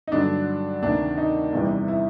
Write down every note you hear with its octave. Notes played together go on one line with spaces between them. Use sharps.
D#4
G2 D3 F#3 D4
D2 C3 D#3 D4
D#4
E2 C3 E3 G3
E4